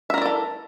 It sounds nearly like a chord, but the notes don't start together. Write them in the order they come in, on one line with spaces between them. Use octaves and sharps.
E5 A#4 E4 D5 A4